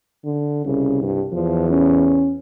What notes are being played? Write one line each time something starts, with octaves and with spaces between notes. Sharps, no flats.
D3
C2 C#3
G2
E2 F3
C#4